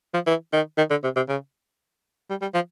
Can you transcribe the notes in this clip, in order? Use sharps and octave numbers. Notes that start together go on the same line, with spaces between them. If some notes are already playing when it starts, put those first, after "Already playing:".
F3
E3
D#3
D#3
D3
C3
C3
C#3
G3
G3
F3